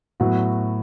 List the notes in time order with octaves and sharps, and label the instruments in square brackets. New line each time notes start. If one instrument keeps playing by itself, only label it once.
[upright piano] A2 F#3 B3 F#4